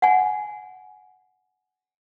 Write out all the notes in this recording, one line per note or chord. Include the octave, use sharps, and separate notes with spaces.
F#5 G#5